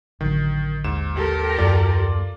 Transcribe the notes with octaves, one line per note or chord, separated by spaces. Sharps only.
A1 D3 D#3 F#3
D#2 G#2 E7
G#2 G4 A4 A#4
F#2 A#3 F4 D5